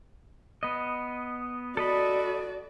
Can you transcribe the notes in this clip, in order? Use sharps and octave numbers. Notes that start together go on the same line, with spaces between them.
B3 D#5
F#4 A4 D5 D#5 B5